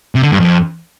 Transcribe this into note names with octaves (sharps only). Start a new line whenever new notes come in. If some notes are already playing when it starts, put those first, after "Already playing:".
C3
D3
G2
F2